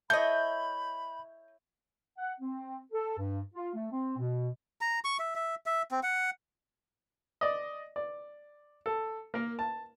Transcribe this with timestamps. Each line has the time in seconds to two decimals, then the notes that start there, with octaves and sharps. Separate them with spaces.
0.10 E4 A4 C#5 D#5 E5 B5 G6
2.18 F#5
2.40 C4
2.92 A4
3.17 G2
3.54 F4
3.74 A3
3.91 C4
4.17 B2
4.81 A#5
5.04 C#6
5.19 E5
5.35 E5
5.66 E5
5.91 C4
6.03 F#5
7.41 D5 D#5
7.96 D5
8.86 A4
9.34 A#3 A#4
9.59 A5